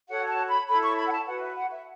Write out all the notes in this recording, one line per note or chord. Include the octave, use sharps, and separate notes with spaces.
F#4 A4 C#5 F#5
A5
B5
E4 A4 C#5 B5
C#6
B5
F#5
A5
F#4 B4 F#5
E5
F#5
E5